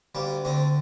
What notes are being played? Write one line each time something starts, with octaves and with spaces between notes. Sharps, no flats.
D2 G3 A#3
D3 A3 C4